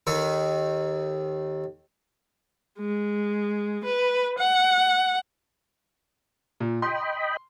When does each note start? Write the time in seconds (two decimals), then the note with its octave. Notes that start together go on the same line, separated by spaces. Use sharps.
0.07 D#2 D#3 A4
2.80 G#3
3.84 B4
4.39 F#5
6.60 A#2
6.82 D#5 G5 B5 C6